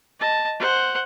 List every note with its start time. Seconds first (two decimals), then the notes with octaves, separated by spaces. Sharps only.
0.20 D#5 A5
0.60 C5 F#5